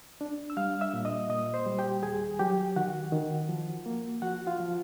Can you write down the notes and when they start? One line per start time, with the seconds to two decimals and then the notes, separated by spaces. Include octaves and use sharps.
0.21 D4
0.50 E6
0.57 G3 F5 F6
0.81 E5 E6
0.93 A#2
1.05 D#5 D#6
1.30 A#2 D#5 D#6
1.54 C5 C6
1.66 G3
1.79 G4 G5
2.03 D#2 G#4 G#5
2.39 F#3 G4 G5
2.76 D#3 F#4 F#5
3.12 D#3
3.49 F3
3.86 A#3
4.22 F3 F#4 F#5
4.47 F4 F5
4.59 F3